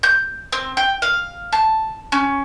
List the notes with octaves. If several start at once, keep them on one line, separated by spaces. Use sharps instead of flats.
G6
C4
G5
F5
A5
C#4